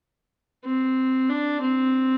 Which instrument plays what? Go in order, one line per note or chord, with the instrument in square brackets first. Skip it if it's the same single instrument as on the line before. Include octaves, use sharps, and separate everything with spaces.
[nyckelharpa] C4
D4
C4